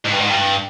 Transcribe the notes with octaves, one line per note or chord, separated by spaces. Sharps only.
G#2
G2
G#2
G2